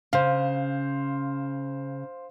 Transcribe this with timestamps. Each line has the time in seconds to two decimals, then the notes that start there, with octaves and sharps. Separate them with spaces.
0.13 C#3 C5 F5